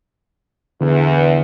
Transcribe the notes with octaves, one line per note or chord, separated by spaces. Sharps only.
E2 D3